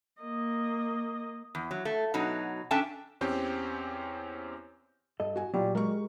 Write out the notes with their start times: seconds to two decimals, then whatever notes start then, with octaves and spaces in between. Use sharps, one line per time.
0.22 A#3 D#5
1.55 E2
1.71 F#3
1.85 A3
2.14 B2 F#3 D#4
2.71 C#4 D4 A4 E5 G5 A5
3.21 E2 C4 C#4 G4 G6
5.20 G2 A4 D#5
5.36 F#4 G#5
5.54 A#2 F#3 G3 F4
5.75 G#3 G4 A#4 C#6